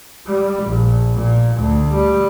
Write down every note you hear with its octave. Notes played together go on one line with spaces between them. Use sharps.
G3
A#1
A#2
D2
G3